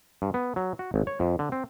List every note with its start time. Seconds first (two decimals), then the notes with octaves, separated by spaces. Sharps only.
0.22 G2
0.34 B3
0.56 F#3
0.79 F#4
0.94 G#1
1.07 C#5
1.20 F2
1.39 D3
1.52 C4